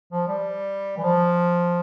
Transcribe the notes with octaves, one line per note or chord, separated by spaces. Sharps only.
F3
G3
E3
F3